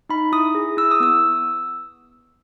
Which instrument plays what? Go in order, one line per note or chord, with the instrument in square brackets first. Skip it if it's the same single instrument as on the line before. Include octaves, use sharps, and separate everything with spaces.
[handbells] D#4 B5
E4 D#6
G#4
E4 E6
D#6
B3 E6